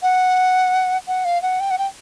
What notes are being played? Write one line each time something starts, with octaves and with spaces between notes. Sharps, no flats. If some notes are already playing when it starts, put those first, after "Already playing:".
F#5
F#5
F5
F#5
G5
F#5
G5